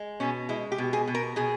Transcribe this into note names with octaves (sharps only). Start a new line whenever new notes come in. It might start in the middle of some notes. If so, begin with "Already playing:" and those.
Already playing: G#3
B2 C#4
G#3 E4
G4
B2
G#4
B2
A#4
B2 G#4